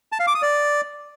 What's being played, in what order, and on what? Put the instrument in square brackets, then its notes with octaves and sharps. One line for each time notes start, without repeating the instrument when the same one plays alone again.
[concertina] A5
F5
D6
D#6
D5